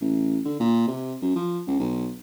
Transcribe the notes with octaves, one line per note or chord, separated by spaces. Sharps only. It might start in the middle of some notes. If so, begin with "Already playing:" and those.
A1
D3
A#2
C3
F#2
F3
C#2
B1